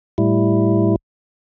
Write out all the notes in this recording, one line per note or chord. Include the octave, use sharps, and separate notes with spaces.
A2 G3 E4